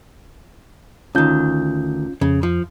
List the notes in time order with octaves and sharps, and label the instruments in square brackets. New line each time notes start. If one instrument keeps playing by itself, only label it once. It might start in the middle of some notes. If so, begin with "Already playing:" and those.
[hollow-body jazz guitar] D2 D#3 [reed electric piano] C#4 F4 G6
[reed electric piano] F2 [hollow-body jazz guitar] C#3
[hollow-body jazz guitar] F3